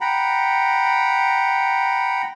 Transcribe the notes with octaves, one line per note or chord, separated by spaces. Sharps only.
F#5 G5 A#5 B5